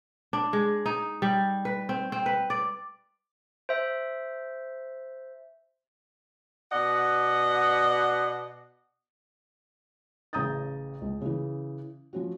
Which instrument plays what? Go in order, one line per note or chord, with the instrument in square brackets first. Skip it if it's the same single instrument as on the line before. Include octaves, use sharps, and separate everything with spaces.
[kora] D4
G#3
D#4
G3
B4
C4
C4
B4
D5
[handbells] C5 E5
[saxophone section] B2 D5 D#5 F#5
[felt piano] A1 C#3 A#5 D#6 G6 A6
C#2
C#3 E3
F3 C#4 F#4